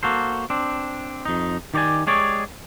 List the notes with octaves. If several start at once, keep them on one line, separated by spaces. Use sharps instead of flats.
A#3 F#4 A4 C5
C4 D4
F2 D#4
D#3 G4 C#5 D5 G#5
G#3 G4 G#4 C#5 D5